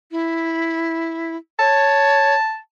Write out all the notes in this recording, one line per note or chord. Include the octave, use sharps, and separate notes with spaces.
E4
C#5 A5